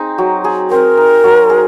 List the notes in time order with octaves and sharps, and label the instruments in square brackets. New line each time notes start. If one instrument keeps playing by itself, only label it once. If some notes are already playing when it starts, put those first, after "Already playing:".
Already playing: [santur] C4 D#4 G#4
F#3
G#4
[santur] C4 [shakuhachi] A#4
[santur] D#4
F#3
G#4